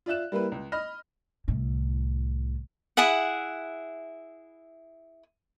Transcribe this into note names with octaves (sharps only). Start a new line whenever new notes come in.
F4 D5 E5 F#6 E7
G3 A#3 E4 B4
C#2
D#5 B5 F6 A#6
C2 A2
E4 G#4 E5 F#5